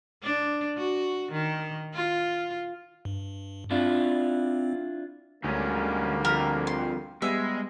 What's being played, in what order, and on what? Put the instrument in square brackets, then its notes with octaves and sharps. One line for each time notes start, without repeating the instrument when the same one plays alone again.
[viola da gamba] D4
F#4
D#3
F4
[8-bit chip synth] G2
[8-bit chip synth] C4 [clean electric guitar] D4 E4 F4
[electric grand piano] D2 [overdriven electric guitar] G#2 C#4 [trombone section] D3 G3 A#3
[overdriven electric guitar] F2 [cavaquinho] A#4
[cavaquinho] C6
[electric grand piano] G3 B3 [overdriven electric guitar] G#3 [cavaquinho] E5